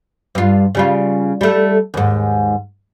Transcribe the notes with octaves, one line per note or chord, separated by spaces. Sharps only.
G2 F4
C#3 G3 F4
G3 A3
D#2 G#2